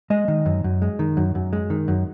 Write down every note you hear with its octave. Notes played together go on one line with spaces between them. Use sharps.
G#3 D#5
D#3
F#2
F#2
G#3
D#3
F#2
F#2
G#3
D#3
F#2